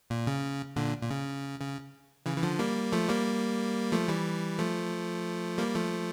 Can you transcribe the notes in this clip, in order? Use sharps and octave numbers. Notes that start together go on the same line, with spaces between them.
A#2
C#3
A#2 D3
A#2
C#3
C#3
C#3 E3
E3
D3 F3
G3 A#3
F3 A3
G3 A#3
F3 A3
E3 G3
F3 A3
G3 A#3
F3 A3